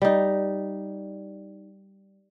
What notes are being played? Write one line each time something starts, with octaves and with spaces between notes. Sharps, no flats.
G3 D#4